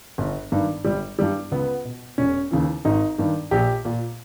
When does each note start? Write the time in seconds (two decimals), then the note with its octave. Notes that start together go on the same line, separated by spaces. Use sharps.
0.18 G1
0.52 G2 D#3
0.84 G1 G3
1.18 G2 E3 G3
1.52 C#2 B3
1.85 B2
2.18 E1 C#4
2.51 D#2 C#3 E3
2.85 G#1 D#4
3.18 G2 D#3
3.51 A#1 G4
3.85 A#2